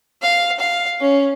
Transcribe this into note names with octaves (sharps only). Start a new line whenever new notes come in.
F5
F5
C#4